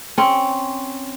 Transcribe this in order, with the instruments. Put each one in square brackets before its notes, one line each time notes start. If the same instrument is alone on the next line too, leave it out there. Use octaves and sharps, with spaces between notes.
[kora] C4 C#4